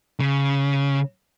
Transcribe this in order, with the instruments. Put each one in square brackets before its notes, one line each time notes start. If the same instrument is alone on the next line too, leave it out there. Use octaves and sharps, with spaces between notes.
[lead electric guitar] C#3